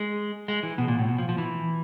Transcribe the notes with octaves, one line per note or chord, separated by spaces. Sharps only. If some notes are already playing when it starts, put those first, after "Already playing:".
Already playing: G#3
G#3
E3
B2
A#2
A2
B2
F3
F3
E3